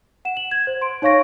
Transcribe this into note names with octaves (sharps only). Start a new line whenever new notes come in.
F#5 E7
F#7
G#6
C5
C6 D7
D#4 C#5 F5 C#6 A#6 D7